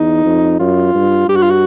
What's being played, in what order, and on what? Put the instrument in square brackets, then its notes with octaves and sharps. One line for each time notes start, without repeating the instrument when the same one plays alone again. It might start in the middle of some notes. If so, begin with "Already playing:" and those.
Already playing: [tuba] E2 [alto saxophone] D#4
[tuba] F2
[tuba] F#2 [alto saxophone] F4
[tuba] G2
[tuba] G2 [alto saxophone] G4
[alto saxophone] F#4
F4
F#4